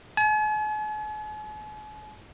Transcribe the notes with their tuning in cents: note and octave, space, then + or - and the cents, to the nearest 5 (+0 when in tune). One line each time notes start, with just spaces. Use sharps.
G#5 +45